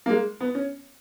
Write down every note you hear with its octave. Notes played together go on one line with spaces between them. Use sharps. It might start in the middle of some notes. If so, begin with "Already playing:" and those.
A#3
G#3
B3
C#4